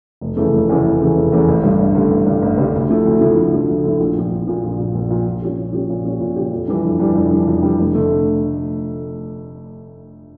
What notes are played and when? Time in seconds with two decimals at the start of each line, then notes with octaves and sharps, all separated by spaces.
0.21 F1
0.37 E2 C#3 E3 A3
0.53 F1
0.69 E2 C#3 E3 A3
0.84 F1
1.01 E2 C#3 E3 A3
1.16 F1
1.32 E2 C#3 E3 A3
1.48 A1
1.63 G2 D3 G3
1.79 A1
1.95 G2 D3 G3
2.11 A1
2.26 G2 D3 G3
2.42 A1
2.57 G2 D3 G3
2.74 D2
2.90 D3 F3 A3 E4
3.06 D2
3.21 D3 F3 A3 E4
3.37 D2
3.53 D3 F3 A3 E4
3.69 D2
3.84 D3 F3 A3 E4
3.99 A#1
4.15 A#2 F3
4.31 A#1
4.47 A#2 F3
4.64 A#1
4.79 A#2 F3
4.95 A#1
5.10 A#2 F3
5.27 A#2
5.42 F3 C#4 G4
5.58 A#2
5.73 F3 C#4 G4
5.90 A#2
6.05 F3 C#4 G4
6.20 A#2
6.36 F3 C#4 G4
6.52 F2
6.67 E3 G3 D4
6.84 F2
6.99 E3 G3 D4
7.15 F2
7.31 E3 G3 D4
7.48 F2
7.63 E3 G3 D4
7.79 F1
7.95 D3 A3